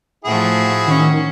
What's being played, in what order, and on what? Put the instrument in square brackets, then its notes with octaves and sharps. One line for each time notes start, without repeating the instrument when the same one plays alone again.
[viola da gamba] A2 F3 [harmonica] E4 F#4 G#4
[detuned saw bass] D#3 [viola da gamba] C#4